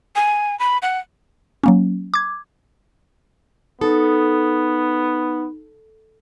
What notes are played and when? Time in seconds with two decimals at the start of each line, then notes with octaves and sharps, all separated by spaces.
0.16 G#5
0.59 B5
0.82 F#5
1.64 F#3 A#3 C#4
2.14 D6 G#6
3.81 B3 D#4 A4